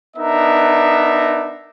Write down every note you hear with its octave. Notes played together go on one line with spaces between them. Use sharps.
B3 D4 D#4 A#4 E5